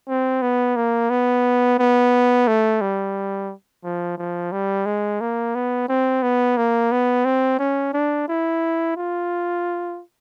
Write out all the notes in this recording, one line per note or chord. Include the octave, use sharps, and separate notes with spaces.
C4
B3
A#3
B3
B3
A3
G3
F3
F3
G3
G#3
A#3
B3
C4
B3
A#3
B3
C4
C#4
D4
E4
F4